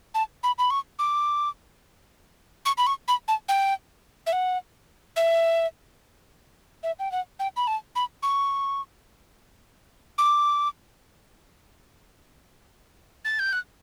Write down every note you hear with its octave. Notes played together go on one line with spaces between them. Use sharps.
A5
B5
B5
C#6
D6
C#6
B5
C#6
B5
A5
G5
E5
F#5
E5
E5
G5
F#5
G5
B5
A5
B5
C#6
D6
A6
G6
F#6